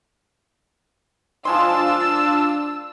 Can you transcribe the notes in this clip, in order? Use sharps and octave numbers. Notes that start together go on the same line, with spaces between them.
F3 G#3 D4 F4 A5 C6 E6